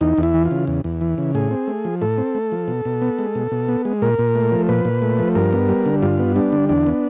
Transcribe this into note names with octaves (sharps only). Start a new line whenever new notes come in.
E2 D#4
E2
E4
E3
F4
C#3
E2
E2
E3
C#3
A2 G#4
C4
A3
F3
A2 A4
C4
A3
F3
B2
B2
B3
G#3
B2
B2
B3
G#3
A#2 A#4
A#2
A3
F3
A#2 B4
A#2
A3
F3
G2 A#4
B3
G3
D3
G2 F4
B3
G3 D4
D3
E2 D4
B3